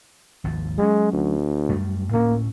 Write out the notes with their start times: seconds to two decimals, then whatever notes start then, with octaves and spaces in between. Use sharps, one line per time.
0.44 G#1 D#2 F3
0.78 F#3 G#3 C#4
1.13 D2
1.69 F#2 G3 A3
2.12 D2 A2 A#3 C#4